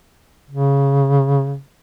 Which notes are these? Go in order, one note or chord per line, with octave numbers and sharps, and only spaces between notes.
C#3